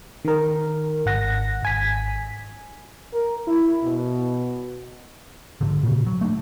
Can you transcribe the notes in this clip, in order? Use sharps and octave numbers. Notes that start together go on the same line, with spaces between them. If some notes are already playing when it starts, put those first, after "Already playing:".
D#3 A#4
G#1 F#5 A#6
G#1 G#5 B6
A#4
E4
B2
G#2 D3
A#2 C#3
F#3
A3 D4